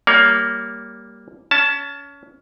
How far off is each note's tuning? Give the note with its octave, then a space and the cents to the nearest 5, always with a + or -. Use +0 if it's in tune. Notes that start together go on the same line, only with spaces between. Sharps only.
G3 +0 A#3 +0 C#5 +35
C#4 +25 A5 +0